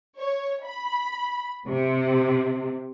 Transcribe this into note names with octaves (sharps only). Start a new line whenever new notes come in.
C#5
B5
C3